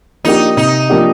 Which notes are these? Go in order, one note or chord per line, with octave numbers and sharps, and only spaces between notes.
F3 A#3 D4 D#4 G4
C3 D#4
F3 A#3 D4 G4